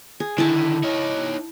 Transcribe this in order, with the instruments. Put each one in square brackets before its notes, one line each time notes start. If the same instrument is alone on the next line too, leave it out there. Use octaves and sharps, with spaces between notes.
[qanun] G#4
[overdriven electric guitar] D3 D#3 [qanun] E4 E5 A5
[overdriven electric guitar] D#4 C#5